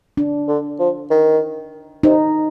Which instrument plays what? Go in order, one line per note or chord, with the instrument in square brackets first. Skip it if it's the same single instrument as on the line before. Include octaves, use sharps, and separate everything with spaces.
[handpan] D4
[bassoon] D3
F3
D#3
[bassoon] C3 [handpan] D#4